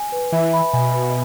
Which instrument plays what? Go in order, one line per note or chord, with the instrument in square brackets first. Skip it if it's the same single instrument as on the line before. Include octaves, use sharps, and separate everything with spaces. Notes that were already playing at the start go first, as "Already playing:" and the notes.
Already playing: [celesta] G#5
B4
[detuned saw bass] E3 [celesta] E5
[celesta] B5
[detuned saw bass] B2 [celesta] G#5
[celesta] B4